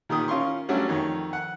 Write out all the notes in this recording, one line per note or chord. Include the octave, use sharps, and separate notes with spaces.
A#2 D#3 G4 G5 D#6
C#4 F4 A#4 C6 C#6
F#3 G3 A3 C#4 D4 F#4
F2 D#3 C#5
F#5